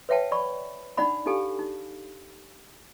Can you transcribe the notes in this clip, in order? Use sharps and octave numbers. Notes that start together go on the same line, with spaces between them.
B4 C#5 E5 F#5 G5 A5
D5 B5 C#6
D4 D#4 D5 F#5 B5
D4 D#4 G4 A4 F5 G#5
D#4